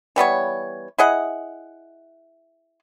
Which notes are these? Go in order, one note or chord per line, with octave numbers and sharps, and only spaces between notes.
E3 G3 B3 C#5
E4 G#4 D#5 F#5